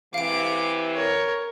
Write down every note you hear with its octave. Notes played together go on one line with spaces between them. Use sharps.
C3 E3 F5 D6 D7
A#4 C#5